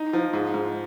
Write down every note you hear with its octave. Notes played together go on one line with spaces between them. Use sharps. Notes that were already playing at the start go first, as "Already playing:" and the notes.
Already playing: D#4
F3
G#2
G#2